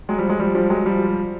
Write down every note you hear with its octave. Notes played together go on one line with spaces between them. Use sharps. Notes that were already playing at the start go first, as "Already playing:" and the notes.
F#3 G#3
F3 G3
F#3 G#3
F3 G3
F3 G3
F#3 G#3
F3 G3